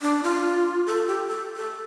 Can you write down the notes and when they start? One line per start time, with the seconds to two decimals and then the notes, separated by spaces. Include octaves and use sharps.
0.02 D4
0.23 F4
0.86 A4
1.07 G4
1.28 A4
1.56 A4